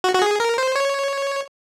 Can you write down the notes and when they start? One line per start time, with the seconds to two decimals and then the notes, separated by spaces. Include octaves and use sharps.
0.04 F#4
0.14 F#4
0.22 G#4
0.40 A#4
0.58 C5
0.76 C#5